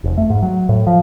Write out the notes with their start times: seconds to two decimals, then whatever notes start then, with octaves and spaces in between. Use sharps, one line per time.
0.04 F1
0.18 A3
0.30 G#2
0.42 F#3
0.69 A2
0.87 F3